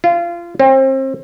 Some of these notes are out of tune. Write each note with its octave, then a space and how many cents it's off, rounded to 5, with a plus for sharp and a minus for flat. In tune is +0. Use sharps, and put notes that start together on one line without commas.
F4 -25
C4 +35